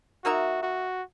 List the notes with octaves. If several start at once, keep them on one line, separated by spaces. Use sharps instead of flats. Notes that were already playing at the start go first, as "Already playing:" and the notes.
A#3 D#4 F#4 A#4 E5
F#4